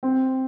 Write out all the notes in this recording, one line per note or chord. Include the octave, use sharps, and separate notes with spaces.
C4